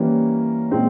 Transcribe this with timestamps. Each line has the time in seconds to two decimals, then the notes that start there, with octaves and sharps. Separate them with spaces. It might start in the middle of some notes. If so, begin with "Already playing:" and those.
Already playing: E3 G3 A#3 C#4
0.71 A#2 G#3 C4